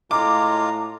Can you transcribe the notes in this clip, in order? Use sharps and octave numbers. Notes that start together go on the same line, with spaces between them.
A2 G#3 F4 F5 A#5 D6